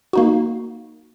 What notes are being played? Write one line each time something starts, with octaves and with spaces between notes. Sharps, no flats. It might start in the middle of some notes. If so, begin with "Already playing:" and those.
A#3 D#4 F#4